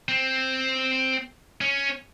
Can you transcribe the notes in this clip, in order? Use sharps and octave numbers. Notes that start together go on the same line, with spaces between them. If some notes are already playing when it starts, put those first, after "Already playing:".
C4
C#4